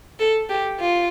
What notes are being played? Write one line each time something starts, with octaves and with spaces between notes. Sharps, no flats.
A4
G4
F4